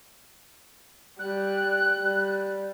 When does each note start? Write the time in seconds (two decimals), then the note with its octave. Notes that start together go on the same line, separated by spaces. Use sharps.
1.19 G3 F#6
1.96 G3